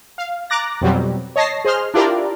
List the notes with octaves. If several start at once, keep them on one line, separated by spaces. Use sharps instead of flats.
F5
A#5 D6 F#6 A6 A#6
F2 B2 F#3 G3 C4
C#5 D#5 A5 A#6 C7
G#4 C5 D#5 C6 F6
D4 E4 F4 G4 A#4 D5